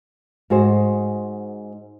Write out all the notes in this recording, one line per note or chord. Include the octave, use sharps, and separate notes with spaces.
G#2 F#4 G#4 C5